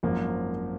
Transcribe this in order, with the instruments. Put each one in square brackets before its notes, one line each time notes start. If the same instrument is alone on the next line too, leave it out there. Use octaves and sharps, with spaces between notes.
[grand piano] G#1 F#2 F3 A#3